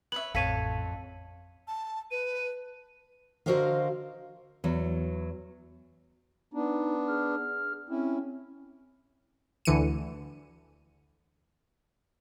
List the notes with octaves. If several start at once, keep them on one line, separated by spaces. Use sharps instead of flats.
B4 C#5 E5 F#7
A1 F2 A4 C#5 F5 A5 B6 D#7
A5
B4 D#7
D3 F#4 A#4 C5 D#5 F5
E2 F#3
B3 D4 D#4
G#4 F6
C4 C#4 E4
D2 D3 E3 C#7 D#7